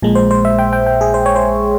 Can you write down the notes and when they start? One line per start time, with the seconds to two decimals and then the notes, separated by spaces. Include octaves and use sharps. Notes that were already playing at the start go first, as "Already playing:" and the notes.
0.02 A#1 A#2 G#3
0.15 C5
0.31 C5
0.45 E5
0.59 G5
0.73 G5
0.87 G5
1.01 G#4
1.14 C5
1.26 C#5
1.36 C5